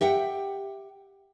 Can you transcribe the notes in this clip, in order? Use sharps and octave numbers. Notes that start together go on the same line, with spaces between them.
G4 E5 F#5 G5